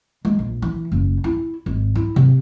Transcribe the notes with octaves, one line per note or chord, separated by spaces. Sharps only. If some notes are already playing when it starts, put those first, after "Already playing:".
G#3
A#1
E3
F#1
E4
G#1
E4
C3